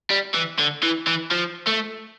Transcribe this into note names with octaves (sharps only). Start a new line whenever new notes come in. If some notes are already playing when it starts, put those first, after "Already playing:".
G3
E3
D3
E3
E3
F3
A3